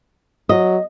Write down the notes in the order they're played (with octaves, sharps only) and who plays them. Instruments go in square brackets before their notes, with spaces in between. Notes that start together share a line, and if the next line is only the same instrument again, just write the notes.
[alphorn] F#3 [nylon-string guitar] D#5